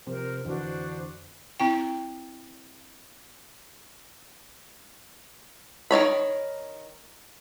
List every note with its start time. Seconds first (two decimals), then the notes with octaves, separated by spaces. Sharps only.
0.07 C3 F3 C4 A#4 C5
0.45 F2 D3 E3 D4 F#4 C5
1.60 C4 E4 G5
5.91 D#3 D#4 C#5 B5